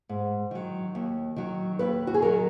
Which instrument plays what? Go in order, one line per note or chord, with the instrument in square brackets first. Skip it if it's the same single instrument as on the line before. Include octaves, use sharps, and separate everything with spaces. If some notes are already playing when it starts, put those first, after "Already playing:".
[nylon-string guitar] G#2
D#3 F#3
D#2
D#3 F#3
D#2 B4
F#4
G#4
D#3 F#3 A#4